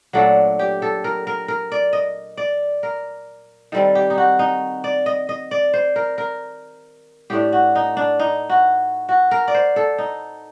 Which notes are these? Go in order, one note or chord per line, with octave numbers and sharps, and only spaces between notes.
A#2 F#3 A3 D4 A4
G4
A4
A#4
A#4
A#4
D5
D#5
D5
A#4
D#3 G3 C4 A4
G4
D#4
F#4
D#4
D5
D#5
D#5
D5
C5
A#4
A#4
A2 A3 D4 G4
F#4
D#4
D4
D#4
F#4
F#4
A#4
D5
C5
A4
D#4